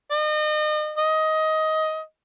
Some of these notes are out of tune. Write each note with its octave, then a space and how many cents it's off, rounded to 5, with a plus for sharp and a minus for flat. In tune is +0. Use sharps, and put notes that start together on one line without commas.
D#5 -35
D#5 +15